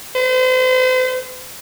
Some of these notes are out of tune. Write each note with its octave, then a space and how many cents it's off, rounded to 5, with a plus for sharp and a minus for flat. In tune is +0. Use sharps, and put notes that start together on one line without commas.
C5 -40